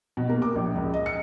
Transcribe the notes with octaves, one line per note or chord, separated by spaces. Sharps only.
B2
A#3
D6
A#1
C#2
D#5
C#7